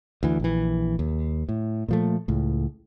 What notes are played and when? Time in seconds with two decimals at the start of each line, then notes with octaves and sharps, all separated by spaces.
0.23 D2 E3
0.40 A#1 E3
0.99 D#2
1.49 A2
1.88 A#2 F3 A3
2.28 C#2 A2